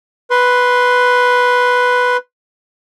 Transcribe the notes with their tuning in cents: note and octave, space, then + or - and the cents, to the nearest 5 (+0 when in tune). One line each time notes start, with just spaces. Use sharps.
B4 +0 C6 +0